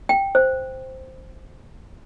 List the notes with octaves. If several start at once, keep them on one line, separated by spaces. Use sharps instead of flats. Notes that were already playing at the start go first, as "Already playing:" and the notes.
G5
C5